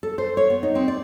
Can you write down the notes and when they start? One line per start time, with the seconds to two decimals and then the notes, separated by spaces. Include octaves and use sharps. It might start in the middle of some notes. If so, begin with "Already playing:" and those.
0.03 A4
0.18 C5
0.37 C#5
0.50 B3
0.63 D#4
0.75 C4
0.88 D5